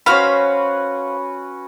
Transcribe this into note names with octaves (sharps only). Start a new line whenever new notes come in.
C#4 F#4 B4 C5 F5 B5